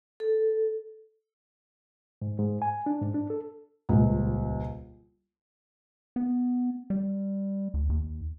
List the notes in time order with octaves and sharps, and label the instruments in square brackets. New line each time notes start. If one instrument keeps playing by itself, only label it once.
[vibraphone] A4
[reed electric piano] G#2
G#2
G#5
D4
G#2
D4
A4
[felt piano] D#1 C#2
[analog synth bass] B3
G3
D2
D#2